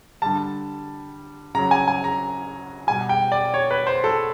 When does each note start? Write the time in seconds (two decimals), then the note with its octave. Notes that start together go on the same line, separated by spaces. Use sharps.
0.22 D3 G3 A5
1.55 C#3 F#3 A#5
1.71 G#5
1.88 G#5
2.04 A#5
2.87 B2 G3 G#5
3.09 G5
3.32 D5
3.54 C#5
3.71 B4
3.87 C5
4.04 A4